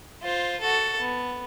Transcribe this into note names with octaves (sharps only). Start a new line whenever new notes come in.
F4 C5
F#4 A4
B3